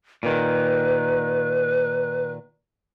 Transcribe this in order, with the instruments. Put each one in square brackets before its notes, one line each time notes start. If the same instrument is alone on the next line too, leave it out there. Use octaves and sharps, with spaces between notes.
[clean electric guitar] A#2 D#3 [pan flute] B4